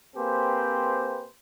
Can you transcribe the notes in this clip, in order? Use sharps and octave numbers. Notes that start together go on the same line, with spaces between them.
A#3 C4 G4 G#4 B4 C5